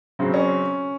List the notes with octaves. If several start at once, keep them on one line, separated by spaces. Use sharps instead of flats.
C#3 F#3 C4
C#4